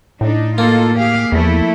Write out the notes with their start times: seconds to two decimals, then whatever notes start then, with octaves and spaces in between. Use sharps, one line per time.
0.21 A2 D4 D#4
0.58 A#3 D#4 F4 A4
0.95 G4 G#4 F5
1.32 E2 F3 A3 E4